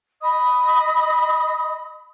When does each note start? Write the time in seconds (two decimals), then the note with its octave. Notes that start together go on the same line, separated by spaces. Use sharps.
0.22 D#5 B5 D#6